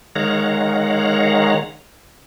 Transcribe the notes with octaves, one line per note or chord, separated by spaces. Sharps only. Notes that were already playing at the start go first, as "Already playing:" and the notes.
D#3 G#3 C#5 F5 F#5 A#5